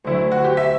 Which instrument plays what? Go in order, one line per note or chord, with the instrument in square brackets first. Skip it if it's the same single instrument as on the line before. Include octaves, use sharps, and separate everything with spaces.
[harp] D2 D3 F#3 [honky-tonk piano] E4
[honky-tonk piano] F#4
G4
E5